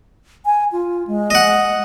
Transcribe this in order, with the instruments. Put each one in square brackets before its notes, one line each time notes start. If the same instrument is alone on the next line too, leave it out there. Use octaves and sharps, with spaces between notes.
[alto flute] G#5
F4
G#3
[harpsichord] D#5 F#5